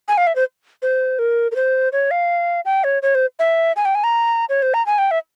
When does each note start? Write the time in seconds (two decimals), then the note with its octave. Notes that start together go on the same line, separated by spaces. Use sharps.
0.08 G#5
0.18 F5
0.27 E5
0.36 C5
0.82 C5
1.19 A#4
1.52 A#4
1.55 C5
1.92 C#5
2.11 F5
2.65 G5
2.84 C#5
3.03 C#5
3.15 C5
3.39 E5
3.76 G#5
3.85 G5
3.95 G#5
4.04 A#5
4.49 C#5
4.62 C5
4.74 A#5
4.86 G#5
4.98 G5
5.11 E5